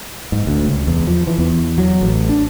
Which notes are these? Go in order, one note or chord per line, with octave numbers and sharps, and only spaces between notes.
G#2
D2
C#2
E2
F3
E3
E2
F#3
A1
D4